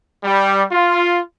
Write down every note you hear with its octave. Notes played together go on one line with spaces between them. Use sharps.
G3
F4